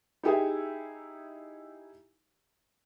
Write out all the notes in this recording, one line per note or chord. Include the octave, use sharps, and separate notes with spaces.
D#4 E4 G4 G#4 E5 G5